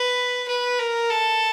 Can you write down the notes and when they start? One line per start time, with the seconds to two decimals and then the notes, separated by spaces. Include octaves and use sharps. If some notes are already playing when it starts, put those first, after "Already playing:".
Already playing: B4
0.48 B4
0.79 A#4
1.10 A4